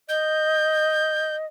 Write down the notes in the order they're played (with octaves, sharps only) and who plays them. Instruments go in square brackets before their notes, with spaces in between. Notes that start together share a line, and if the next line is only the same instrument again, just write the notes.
[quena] D#5 [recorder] G6